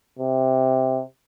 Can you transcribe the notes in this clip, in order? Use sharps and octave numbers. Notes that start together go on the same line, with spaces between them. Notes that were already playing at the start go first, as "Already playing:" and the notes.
C3